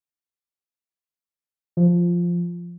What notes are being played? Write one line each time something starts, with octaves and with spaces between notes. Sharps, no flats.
F3